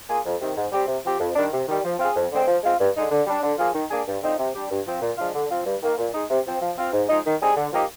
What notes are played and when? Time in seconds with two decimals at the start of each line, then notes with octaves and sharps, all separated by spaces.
0.09 A#3 F4 G#4
0.25 F2
0.41 C3 D#3
0.57 G#2
0.72 G3 C4 G4
0.88 C3
1.04 F3 C4 G4
1.20 F2
1.36 D#3 G3 D4
1.53 C3
1.68 D#3 G3
1.85 F3
1.99 C4 F4 G#4
2.16 F2
2.32 D3 G#3 C4
2.48 F3
2.63 G#3 C4 F4
2.80 G2
2.95 D3 G#3 D#4
3.11 D3
3.27 G3 D4
3.43 D3
3.59 F3 A#3 F4 G#4
3.74 D#3
3.90 A#3 D4 G#4
4.07 G2
4.23 D3 F3 C4 D#4
4.39 C3
4.55 G3 D4 G4
4.71 G2
4.87 F3 C4
5.02 A#2
5.18 F3 G#3 D4 F4
5.35 D3
5.50 F3 C4 F4
5.66 G2
5.82 D#3 A#3
5.98 A#2
6.14 G#3 D#4
6.30 C3
6.46 F3 C4
6.61 F3
6.78 C4 F4
6.93 G#2
7.09 F3 G#3 D#4
7.26 D#3
7.41 G3 C4 D#4 G#4
7.57 D3
7.73 F3 A#3 D#4 G4